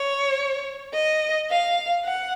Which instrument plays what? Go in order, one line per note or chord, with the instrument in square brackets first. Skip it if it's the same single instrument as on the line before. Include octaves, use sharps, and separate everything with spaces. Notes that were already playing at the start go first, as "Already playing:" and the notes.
Already playing: [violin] C#5
D#5
F5
F#5